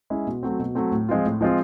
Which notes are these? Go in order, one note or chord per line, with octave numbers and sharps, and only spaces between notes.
G#3 C#4 E4
B2
F#3 A3 C4
B2
F#3 A3 C4
A2
F3 G#3 C4 F4
A2
F3 G#3 C4 F4